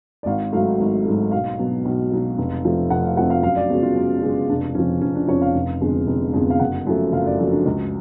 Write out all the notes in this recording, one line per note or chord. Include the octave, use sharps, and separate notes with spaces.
D5
G#1 F5
G#2 F#3 A3 F5
G#1
G#2 F#3 A3
B1 F5
B2 F#3 B3
B1
B2 F#3 B3
F1
F2 F3 A3
F1 F#5
F5
F2 F3 A3 F#5
F5
F#2 F5
D5
C#3 G#3 B3 F#4
F4
F#2
C#3 G#3 B3
F1 D4
F2 C#3 F3 C#4
F1 C#4
D4
F2 C#3 F3 C#5
F5
F1
F2 D3 G#3 B3
F1
F2 D3 G#3 B3
F5
F#1 F#5
F#2 F3 A3
F#1 F5
D5
F#2 F3 A3 F#4
D4
C#2 F#4